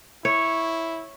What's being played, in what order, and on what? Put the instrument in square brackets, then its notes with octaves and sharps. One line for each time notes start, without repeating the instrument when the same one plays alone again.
[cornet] E4 [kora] C#5